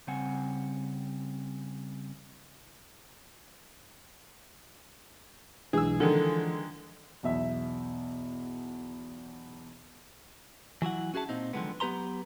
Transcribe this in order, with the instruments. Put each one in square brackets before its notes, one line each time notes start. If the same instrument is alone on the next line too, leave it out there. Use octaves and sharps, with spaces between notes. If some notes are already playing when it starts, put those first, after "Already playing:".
[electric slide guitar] C#3 G3 C4 F#5 G#5
[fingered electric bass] B1 G#3 D4 [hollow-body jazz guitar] E3 [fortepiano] G#4 E6
[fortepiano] D3 D#3 G#3 [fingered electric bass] F3 [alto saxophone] A4
[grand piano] B1 E2 E5
[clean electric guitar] E3 F#3 E4 F#5
C#4 F#4 G#4 E5 A5
A#2 C4 D#4
D3 D#3 F3 F#3 G#3 B3
F#3 B3 G4 B4 A#5 C6